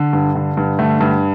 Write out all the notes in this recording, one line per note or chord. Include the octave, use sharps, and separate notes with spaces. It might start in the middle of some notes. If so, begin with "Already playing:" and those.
Already playing: D3
G2
D3
G2
D3 A3
G2